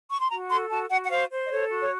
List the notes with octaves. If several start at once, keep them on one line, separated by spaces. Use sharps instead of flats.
C#6
C6
F#4 A#5
A4 C6
F#4 A5
F#4 F#5
F#5
C5 F5
C5
D#5
A4 C#5
F#4
C#5